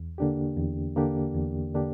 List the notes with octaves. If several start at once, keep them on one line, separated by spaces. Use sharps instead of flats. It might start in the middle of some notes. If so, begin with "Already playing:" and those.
Already playing: E2
D3 A#3 D4 G4
E2
D3 A#3 D4 G4
E2
D3 A#3 D4 G4